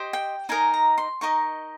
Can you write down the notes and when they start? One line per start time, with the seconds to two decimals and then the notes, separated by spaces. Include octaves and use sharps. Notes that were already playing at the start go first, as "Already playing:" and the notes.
Already playing: G4 C5 D#5
0.13 G5
0.49 D#4 A#4 D#5 G#5
0.74 A#5
0.98 C6
1.21 D#4 A#4 D#5 C#6